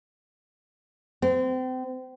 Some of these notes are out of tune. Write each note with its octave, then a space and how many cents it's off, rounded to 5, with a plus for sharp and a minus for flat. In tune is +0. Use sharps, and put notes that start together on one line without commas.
C4 -35